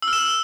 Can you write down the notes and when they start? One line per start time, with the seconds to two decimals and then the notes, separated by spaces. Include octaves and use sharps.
0.02 E6
0.08 F6
0.13 E7